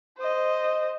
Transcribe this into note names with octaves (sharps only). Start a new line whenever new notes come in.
C5 D#5